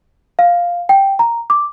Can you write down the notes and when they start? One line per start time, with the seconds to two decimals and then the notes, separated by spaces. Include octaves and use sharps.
0.39 F5
0.89 G5
1.19 A#5
1.50 D6